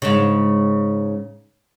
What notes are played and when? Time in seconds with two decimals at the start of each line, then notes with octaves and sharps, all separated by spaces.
0.02 G#2 C#3